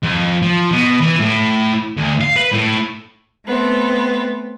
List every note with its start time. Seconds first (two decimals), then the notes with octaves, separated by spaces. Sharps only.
0.03 F2
0.42 F3
0.72 B2
1.01 E3
1.20 A2
1.97 D2
2.21 F5
2.36 B4
2.52 A2
3.45 A3 B3 C4